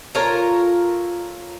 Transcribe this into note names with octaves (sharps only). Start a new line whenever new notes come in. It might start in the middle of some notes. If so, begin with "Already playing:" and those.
F4 A4 A#4 C#5